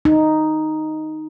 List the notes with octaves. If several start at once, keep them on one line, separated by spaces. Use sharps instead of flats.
D#4